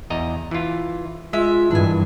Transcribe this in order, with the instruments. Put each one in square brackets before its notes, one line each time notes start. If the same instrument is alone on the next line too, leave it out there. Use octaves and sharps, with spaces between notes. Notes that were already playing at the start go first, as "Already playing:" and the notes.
[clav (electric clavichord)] E2 D#5 A#5
E3 F4
[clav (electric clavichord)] G#3 [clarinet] F4 [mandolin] E5
[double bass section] G2 D#3 E3 [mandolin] D4 G#5 [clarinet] E4